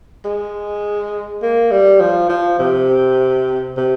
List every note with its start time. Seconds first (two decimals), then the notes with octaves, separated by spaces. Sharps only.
0.25 G#3
1.42 A#3
1.71 G3
2.00 F3
2.29 F3
2.59 C3
3.77 C3